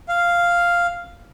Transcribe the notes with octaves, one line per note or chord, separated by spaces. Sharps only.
F5